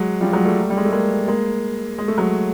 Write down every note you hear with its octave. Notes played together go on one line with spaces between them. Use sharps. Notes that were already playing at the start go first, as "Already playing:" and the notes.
Already playing: F#3 G#3
F3 G3
F#3 G#3
G3 A3
G3
G#3
A3
G#3 A#3
G#3 A#3
G#3
A3
F#3 G#3